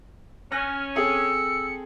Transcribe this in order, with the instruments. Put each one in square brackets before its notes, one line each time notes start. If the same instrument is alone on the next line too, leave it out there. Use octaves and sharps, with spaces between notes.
[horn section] C#4 [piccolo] F6 [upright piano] F#6 A#6
[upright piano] C4 G#4 A4 [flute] E6 [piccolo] C#7